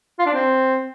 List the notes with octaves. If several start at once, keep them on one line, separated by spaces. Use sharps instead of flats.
F4
D4
C4